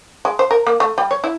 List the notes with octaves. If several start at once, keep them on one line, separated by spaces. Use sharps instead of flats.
G#3
C5
A#4
A#3
A3
G3
C#5
E4